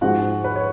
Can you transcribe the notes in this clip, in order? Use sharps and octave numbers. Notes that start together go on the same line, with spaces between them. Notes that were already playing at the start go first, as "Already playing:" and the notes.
G#2 F3 G#3 F#4 F#5
B4
C#5